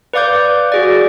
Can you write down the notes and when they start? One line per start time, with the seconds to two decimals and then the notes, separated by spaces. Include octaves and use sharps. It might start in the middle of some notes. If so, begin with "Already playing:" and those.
0.13 B4 D5 F5 D6 G6
0.72 F#4 G#4 D5